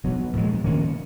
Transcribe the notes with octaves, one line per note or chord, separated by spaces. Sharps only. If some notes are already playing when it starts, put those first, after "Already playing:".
B2 F#3 B3
A#2 F3 G#3
D#3 A#3 C#4